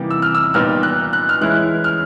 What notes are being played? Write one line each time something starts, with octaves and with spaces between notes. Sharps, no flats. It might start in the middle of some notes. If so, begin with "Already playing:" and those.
Already playing: C3 E3 G3 A#3 D#4 D6
E6
F6
E6
A#2 G3 B3 D#4 F6
F#6
F#6
F6
E3 G#3 C#4 E4 F#6
F6